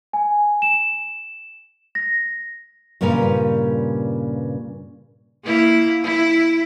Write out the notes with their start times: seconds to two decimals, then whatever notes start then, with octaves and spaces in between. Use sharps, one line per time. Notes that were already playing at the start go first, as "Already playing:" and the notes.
0.13 G#5
0.62 E7
1.95 A#6
3.01 G2 A#2 C#3 G3 A#4 B4
5.44 A#3 E4
6.04 E4